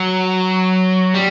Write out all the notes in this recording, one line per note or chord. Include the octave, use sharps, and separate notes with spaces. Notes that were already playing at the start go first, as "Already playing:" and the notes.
Already playing: F#3
G3